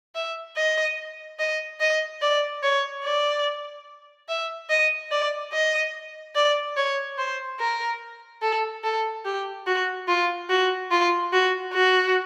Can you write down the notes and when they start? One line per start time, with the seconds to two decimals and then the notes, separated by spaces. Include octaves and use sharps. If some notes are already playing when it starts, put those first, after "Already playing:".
0.15 E5
0.56 D#5
1.39 D#5
1.80 D#5
2.22 D5
2.63 C#5
3.04 D5
4.29 E5
4.69 D#5
5.12 D5
5.53 D#5
6.35 D5
6.77 C#5
7.18 C5
7.59 A#4
8.42 A4
8.84 A4
9.25 G4
9.67 F#4
10.08 F4
10.49 F#4
10.91 F4
11.32 F#4
11.73 F#4